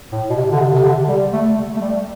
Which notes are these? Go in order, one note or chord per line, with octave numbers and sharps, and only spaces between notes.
A2
B2
C3
D3
C3
C3
D3
G3
A3
A3
G3